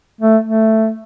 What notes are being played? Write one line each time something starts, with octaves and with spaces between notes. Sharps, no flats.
A3
A3